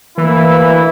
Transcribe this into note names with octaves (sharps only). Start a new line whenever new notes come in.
D2 E3 A#3 E4 B4